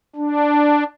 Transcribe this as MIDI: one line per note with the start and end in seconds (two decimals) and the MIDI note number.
0.16 0.84 62